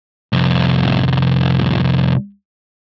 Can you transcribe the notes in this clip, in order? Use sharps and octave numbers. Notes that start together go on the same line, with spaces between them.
C2 F2